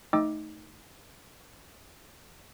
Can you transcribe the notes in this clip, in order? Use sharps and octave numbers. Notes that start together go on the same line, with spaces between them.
A3 D#4 D#5 G5 D6 E6